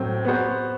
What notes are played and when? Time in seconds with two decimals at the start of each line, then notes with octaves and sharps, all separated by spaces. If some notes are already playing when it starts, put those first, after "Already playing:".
Already playing: A2 F#3 C4
0.25 B3 F#4 C5